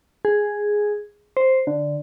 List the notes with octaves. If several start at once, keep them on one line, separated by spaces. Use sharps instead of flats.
G#4
C5
D3